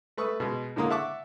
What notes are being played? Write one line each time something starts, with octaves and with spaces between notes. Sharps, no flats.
A3 B4 C#6 D#6 E6
B2 G#3
A2 D3 G#3 A#3 A#5 D#6
E5 F#5 A5 C#6 D6 E6